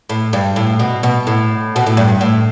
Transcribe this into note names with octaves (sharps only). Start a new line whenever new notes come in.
A2
G2
A2
B2
B2
A2
B2
A2
G2
A2